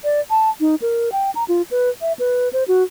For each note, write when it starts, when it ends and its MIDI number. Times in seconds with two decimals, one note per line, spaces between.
0.04 0.21 74
0.30 0.50 81
0.60 0.75 63
0.82 1.10 70
1.12 1.31 79
1.35 1.44 82
1.48 1.62 65
1.71 1.90 71
2.01 2.13 76
2.19 2.49 71
2.53 2.64 72
2.68 2.83 66